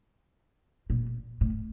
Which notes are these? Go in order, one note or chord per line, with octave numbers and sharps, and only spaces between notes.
A#2
A2